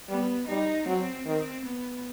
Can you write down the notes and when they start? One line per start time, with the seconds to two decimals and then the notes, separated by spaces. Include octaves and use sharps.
0.09 G3 B3
0.48 G3 D#4
0.86 F#3 C4
1.26 D#3 C4
1.65 B3